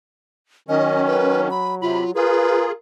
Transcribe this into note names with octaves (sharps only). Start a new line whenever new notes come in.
D#3 F#3 C#4 D#5
B4
B5
C3 F4 B5
F4 G#4 A#4 B4